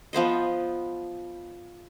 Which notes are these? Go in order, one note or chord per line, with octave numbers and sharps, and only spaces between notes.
F3 B3 C5 D#5